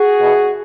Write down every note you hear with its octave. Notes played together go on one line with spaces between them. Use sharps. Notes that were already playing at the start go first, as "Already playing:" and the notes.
Already playing: F#4 G#4
E2 B2